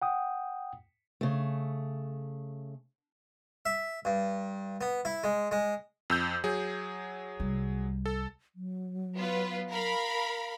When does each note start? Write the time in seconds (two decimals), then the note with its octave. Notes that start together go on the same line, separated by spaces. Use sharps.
0.02 F#5 G5 D#6
1.21 C#3 A3
3.65 E5
4.05 G2
4.81 B3
5.05 E4
5.24 G#3
5.51 G#3
6.10 F2 E6 G6
6.44 F#3 G#4
7.40 C2 G3
8.06 A4
8.55 F#3
9.16 B3 F4 B4
9.71 A#4 F5 B5